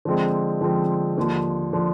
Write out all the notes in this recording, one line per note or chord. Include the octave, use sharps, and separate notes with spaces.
D3 F3 G#3 C4
D3 F3 G#3 C4
D#2 D3 F3
D3 F3